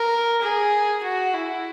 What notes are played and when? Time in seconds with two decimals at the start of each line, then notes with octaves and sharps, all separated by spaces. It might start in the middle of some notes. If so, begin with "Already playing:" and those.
Already playing: A#4
0.42 G#4
1.03 F#4
1.34 E4